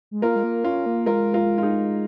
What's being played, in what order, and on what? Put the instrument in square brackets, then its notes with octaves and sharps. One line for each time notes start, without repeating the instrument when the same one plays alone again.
[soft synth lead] G#3
[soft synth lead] A#3 [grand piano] F4 A#4
[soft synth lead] G#3
A#3
[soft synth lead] C#4 [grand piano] F4
[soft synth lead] A#3
[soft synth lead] G#3 [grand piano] F4 A#4
[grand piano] F4 A#4
F4
D#4 G#4